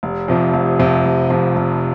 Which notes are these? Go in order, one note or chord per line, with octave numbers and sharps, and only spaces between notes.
F1
F2 C3 F3
F1
F2 C3 F3
F1
F2 C3 F3
F1